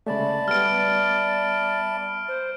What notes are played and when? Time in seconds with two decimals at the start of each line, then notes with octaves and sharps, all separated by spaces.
0.07 C#3 G#3 A3 D5 E5 A5 B5
0.48 G3 B3 F6 D7
2.28 C5